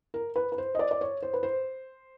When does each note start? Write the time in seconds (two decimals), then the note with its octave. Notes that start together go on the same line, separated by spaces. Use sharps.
0.14 A#4
0.36 B4
0.52 B4
0.58 C5
0.75 D#5
0.79 D5
0.91 D5
1.01 C#5
1.22 C5
1.34 B4
1.43 C5